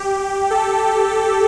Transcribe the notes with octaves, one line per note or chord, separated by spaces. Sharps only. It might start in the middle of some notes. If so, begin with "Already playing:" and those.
Already playing: G4
A4